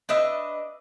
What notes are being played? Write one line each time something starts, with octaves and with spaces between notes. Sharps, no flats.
D4 B4 D#5 E5